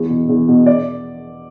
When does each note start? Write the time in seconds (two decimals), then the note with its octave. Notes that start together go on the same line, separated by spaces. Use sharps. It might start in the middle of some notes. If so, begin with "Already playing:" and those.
Already playing: E2
0.09 B2
0.29 E2
0.48 B2
0.66 D5